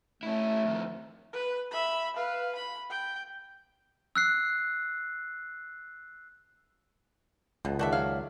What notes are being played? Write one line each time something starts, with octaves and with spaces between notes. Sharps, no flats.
A3 C#4 E4
F2 D#3
B4
E5 B5
B4 F5
B5
G5
E6 F#6 C7
C#2 B2
D#3 F#4 G#4 A4 D5 E5
F#3 F5